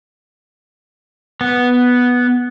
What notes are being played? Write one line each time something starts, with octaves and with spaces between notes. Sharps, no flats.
B3